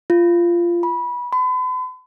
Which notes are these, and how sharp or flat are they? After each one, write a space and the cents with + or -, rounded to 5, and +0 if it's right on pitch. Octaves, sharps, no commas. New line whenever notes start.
F4 -15
B5 -20
B5 +40